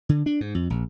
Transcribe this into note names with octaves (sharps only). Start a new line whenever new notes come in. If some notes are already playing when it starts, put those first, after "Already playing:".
D3
D4
G#2
F2
A#1